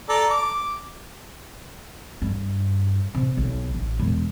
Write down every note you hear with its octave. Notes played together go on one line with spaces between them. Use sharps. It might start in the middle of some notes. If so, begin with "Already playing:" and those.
A4 D5 A#5
D6
G2
C3
B1
A1
E1